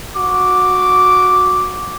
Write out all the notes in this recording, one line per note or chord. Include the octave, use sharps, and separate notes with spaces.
F#4 D6